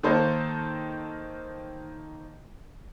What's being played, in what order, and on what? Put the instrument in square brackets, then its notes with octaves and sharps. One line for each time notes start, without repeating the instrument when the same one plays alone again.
[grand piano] D#3 A#3 A4 C5 C#5 D#5